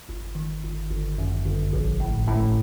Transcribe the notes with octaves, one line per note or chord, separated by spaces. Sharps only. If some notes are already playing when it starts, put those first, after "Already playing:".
G1
D#3
G1
G1
F#2
G1
A#1
A2
A2